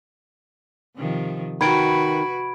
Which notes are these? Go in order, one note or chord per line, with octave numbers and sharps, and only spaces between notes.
C3 D#3 F3
D#3 F#4 B4 B5 G#6 D7